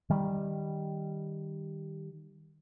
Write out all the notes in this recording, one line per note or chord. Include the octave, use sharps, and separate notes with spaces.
D#3 G3